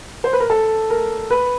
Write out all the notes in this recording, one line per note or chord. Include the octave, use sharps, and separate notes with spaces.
C5
B4
A#4
A4
A#4
B4